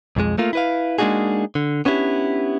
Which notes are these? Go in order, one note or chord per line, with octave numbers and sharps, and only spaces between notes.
B1 F2 G#3
A3 A#3 F4
E4 B4 F5
G#3 A#3 D4 D#4 F#4 G#4
D3
B3 C#4 D4 E4 G4